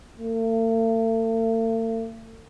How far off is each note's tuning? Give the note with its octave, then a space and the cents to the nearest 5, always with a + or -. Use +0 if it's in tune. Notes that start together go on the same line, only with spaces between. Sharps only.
A3 +45